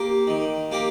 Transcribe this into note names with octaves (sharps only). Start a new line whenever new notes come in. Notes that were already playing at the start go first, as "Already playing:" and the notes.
Already playing: A#3 G4
D#3
A#3 G4